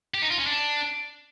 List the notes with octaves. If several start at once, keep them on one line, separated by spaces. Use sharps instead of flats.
G4
D#4
F4
C#4
D4